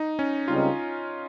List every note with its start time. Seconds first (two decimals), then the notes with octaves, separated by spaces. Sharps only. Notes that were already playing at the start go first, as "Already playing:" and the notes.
Already playing: D#4
0.19 C#4
0.48 C#2 C#3 G3 C4 D#4 F4